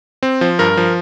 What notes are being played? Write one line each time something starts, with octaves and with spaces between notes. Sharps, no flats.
C4
F3
G2 A#4
F3